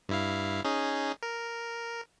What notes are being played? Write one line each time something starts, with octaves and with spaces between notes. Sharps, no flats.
G2 E4 F5
C#4 D#4 G#4
A#4